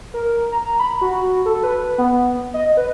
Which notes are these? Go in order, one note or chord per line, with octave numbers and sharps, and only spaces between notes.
A#4
A#5
B5
F#4
A4
B4
B3
D#5
B4